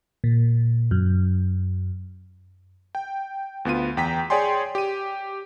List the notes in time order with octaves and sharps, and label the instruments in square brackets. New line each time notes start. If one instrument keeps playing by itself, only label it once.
[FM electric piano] A#2
F#2
[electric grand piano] G5
D2 B3 F4 D#7
E2 G5 A#5 B6
G#4 C#5 D5 G5 G#5 C6
G4 D#7